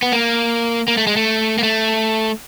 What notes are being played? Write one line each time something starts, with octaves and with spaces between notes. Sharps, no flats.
B3
A#3
A#3
A3
G#3
A3
A#3
A3